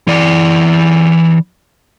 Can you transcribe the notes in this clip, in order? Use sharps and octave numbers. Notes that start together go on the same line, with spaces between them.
E3 D5